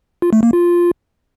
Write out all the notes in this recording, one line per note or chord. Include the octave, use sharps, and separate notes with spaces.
F4
A3
A#3
F4